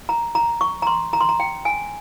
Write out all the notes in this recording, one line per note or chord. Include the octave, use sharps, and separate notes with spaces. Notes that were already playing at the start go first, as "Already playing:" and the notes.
A#5
A#5
C#6
A#5
C6
A#5
C6
A#5
G5
G#5